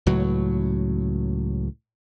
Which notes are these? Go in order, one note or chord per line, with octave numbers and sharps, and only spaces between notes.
C#2 A2 F#3